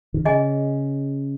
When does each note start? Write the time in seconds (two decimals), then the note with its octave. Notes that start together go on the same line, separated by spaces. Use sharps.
0.14 D#3
0.25 C#3 G#4 D#5 G#5